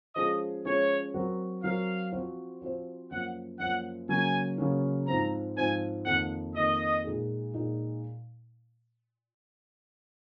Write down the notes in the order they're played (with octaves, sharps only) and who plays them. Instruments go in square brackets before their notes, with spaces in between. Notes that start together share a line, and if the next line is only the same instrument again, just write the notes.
[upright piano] F3 G#3 C#4 G#4 [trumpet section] D#5
[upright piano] F3 G#3 C#4 G#4 [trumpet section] C#5
[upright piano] F#3 C4 F#4 A#4
[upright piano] F#3 C4 F#4 A#4 [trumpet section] F5
[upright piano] F3 C4 F#4 C5
F3 C4 F#4 C5
[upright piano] F#2 F3 A#3 [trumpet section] F#5
[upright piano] F#2 F3 A#3 [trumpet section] F#5
[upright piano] C#3 F#3 A#3 C#4 [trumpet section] G#5
[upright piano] C#3 F#3 A#3 C#4
[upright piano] G#2 F3 C4 [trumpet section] A#5
[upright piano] G#2 F3 C4 [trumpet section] G#5
[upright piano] F2 D#3 A#3 [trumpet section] F#5
[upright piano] F2 D#3 A#3 [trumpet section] D#5
[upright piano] A#2 G#3 D#4 G#4
A#2 G#3 D#4 G#4